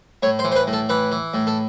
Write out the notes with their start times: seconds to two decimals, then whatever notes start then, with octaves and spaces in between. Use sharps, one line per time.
0.23 A2 C#5
0.39 C5
0.44 E3
0.52 C5
0.56 B4
0.67 A2
0.73 A4
0.89 E3 B4
1.12 E3
1.34 A2
1.47 A4